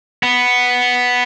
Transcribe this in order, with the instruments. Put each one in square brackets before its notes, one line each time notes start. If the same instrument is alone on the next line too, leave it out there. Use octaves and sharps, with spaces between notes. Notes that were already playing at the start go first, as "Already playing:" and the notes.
[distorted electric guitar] B3